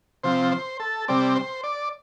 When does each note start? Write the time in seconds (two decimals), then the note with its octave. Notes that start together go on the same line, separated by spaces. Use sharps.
0.24 C3 F3 C4 C5
0.52 C5
0.80 A4
1.08 C3 G3 C4 D5
1.36 C5
1.64 D5